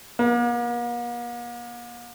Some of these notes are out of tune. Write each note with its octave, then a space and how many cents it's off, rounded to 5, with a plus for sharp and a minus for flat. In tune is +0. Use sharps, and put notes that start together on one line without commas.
A#3 +45